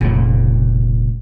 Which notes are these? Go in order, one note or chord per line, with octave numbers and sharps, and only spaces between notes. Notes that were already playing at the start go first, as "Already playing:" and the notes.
F1 A#2 C#3 G#3